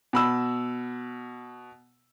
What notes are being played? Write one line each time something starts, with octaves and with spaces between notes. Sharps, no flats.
B2 B5 E6